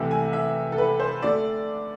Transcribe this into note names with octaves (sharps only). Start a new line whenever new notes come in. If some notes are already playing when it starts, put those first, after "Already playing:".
Already playing: C2 C3 E3 A3
G#5
E5
A4
B4
C5
D3 A3 D5